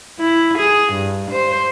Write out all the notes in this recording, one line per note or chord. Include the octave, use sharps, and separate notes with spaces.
E4
G#4
G2
C5